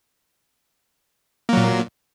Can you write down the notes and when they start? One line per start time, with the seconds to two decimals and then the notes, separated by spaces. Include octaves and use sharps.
1.49 A#3
1.53 F#3
1.57 A#2